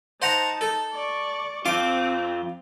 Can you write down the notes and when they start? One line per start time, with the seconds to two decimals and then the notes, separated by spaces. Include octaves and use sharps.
0.22 D#4 C5 F#5 A5 A#5
0.61 A4
0.93 D5 C#6
1.66 F2 C4 F4 D6